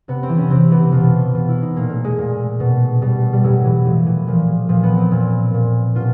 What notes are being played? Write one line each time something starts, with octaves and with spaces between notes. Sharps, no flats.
C3 B3
C4
E3
C#4
C3 C4
E3 B3
B2 F4
B2 F4
E4
D#4
A#2 A#3
A3
G#3
A#2
B2
B2 G3
G3
A2 F#3
E3
A2 F3
E3
A#2 F3
A#2 F3
B3
C4
A#2
A#2
B2 F4